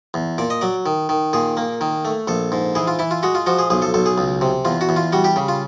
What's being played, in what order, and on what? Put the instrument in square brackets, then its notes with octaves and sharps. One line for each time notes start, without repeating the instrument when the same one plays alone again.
[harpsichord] E2
A#2 D5
D#5
F#3 D5
D#3
D#3
A#2 G#4
A#3
D#3
A3
A#1 A4
G#2
E3 G#4
F4
E3 E4
F4
G#3 F#4
F4
F3 F#4
G#4
B1 G#4
A4
B1 A4
G#4
C#2
C3
E2 F4
F#4
E2
F4
G3 F#4
G4
C#3
F4